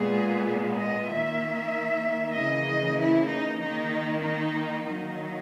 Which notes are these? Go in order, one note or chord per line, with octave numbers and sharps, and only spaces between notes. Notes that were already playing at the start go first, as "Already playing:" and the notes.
Already playing: A#2 G#3 B3 G#4
D#5
D#3 A#3 E5
C#3 E3 A#3 D#5
E4
D#4
D#3 A#3 D#4
D#4
D#3 F#3 A#3 D#4